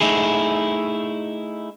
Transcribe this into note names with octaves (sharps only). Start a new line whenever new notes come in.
A3 D#4 E4 G#4